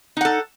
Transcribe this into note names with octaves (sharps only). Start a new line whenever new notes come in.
D#4 A4 F#5